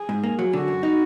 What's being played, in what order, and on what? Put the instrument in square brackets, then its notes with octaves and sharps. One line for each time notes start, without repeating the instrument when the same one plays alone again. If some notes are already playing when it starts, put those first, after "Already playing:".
Already playing: [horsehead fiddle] G#4
[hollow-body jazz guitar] G#2
A#3
F#3
[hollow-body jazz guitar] D3 [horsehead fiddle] F#4
[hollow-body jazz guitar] F#2
D#4